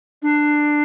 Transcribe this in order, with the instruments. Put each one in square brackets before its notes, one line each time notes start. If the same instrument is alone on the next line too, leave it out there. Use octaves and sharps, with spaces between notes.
[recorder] D4